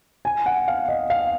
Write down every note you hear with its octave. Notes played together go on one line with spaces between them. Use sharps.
G#5
F#5
F5
D#5
F5